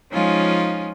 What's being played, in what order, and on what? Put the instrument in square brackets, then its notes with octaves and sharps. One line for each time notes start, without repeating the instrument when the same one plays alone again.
[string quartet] F3 G#3 C#4 D#4 F4